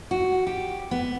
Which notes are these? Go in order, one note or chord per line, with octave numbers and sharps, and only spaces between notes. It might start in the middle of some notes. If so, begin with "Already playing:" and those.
F#4
G4
B3